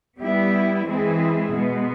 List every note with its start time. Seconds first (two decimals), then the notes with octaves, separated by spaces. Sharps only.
0.19 G3 B3 E4 G4
0.86 E3 G#3 C4 E4 G#4
1.52 B2 G#3 B3